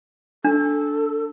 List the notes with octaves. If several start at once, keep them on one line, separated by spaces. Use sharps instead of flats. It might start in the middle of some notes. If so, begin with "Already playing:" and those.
D4 A4